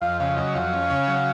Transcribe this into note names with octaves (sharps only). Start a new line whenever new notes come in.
F2 F5
C#3 F5
F#3 D#5
F2 F5
C#4
C#3
F#3